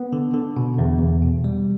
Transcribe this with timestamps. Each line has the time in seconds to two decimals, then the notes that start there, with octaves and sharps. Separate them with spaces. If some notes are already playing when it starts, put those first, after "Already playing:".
Already playing: B3
0.13 D3
0.34 D3
0.57 B2
0.78 E2
1.00 E2
1.22 B2
1.44 G3